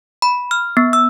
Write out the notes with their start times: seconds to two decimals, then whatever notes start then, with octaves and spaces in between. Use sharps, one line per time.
0.22 B5
0.51 F6
0.77 B3
0.93 E6